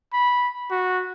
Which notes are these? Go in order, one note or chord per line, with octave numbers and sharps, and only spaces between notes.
B5
F#4